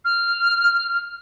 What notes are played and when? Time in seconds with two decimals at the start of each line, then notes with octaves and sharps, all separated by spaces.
0.05 F6